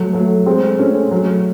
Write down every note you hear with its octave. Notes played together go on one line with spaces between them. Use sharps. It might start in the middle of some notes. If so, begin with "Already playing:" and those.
Already playing: F#3 A3
F#3 A3
G#3 C4
A3 C#4
F#3 A3